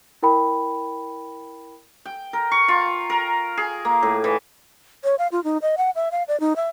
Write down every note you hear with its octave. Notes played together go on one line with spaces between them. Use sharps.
E4 A#4 G5 B5
G5
A#4
C#6
F4
A#4
G#4
A#3
A2
E3
C#5
F5
F4
D#4
D#5
F#5
E5
F5
D5
D#4
E5